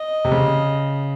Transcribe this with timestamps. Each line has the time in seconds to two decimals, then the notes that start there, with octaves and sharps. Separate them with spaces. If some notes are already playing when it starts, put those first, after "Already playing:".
Already playing: D#5
0.25 C3
0.32 C#3